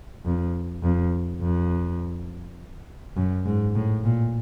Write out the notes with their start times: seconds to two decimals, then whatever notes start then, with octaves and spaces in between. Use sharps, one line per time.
0.25 F2
0.83 F2
1.41 F2
3.17 F#2
3.46 G#2
3.75 A2
4.04 A#2